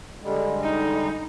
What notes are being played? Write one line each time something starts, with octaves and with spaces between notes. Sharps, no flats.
D3 G3 G#3
D#4